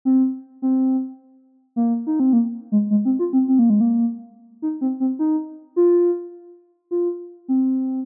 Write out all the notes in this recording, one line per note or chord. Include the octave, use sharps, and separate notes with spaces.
C4
C4
A#3
D#4
C4
A#3
G#3
G#3
C4
F4
C4
C4
A#3
G#3
A#3
D#4
C4
C4
D#4
F4
F4
C4